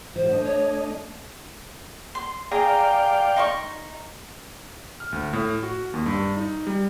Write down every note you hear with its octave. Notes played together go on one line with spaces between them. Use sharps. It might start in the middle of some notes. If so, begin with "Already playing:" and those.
G#2 E3 F#3 C5
A3 D4 D#5
C#5
C6
G#4 D5 F5 G5 A#5
D#4 C6 C#6
F6
D2
A2
F#4
D#2
G2
D#4
G3